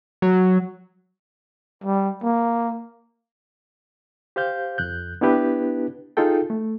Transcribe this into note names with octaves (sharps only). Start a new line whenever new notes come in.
F#3
G3
A#3
G4 C5 F5 G6
F2 F#6 G6
B3 D4 E4 G4 B4
D#4 F4 G#4 A4 G5
A3